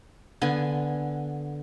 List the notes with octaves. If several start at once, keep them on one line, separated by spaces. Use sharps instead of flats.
D3 B3 G#5